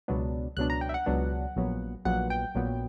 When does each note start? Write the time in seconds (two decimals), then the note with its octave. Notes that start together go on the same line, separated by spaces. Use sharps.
0.08 C#2 B2 F#3 B3 D4
0.57 C#2 B2 F#3 B3 D4 F#6
0.70 A#5
0.81 G5
0.89 E5
0.94 F#5
1.06 C#2 B2 F#3 B3 D4
1.56 A#1 A#2 F#3 B3
2.05 A#1 A#2 F#3 B3 F#5
2.30 G5
2.55 A#1 A#2 F#3 B3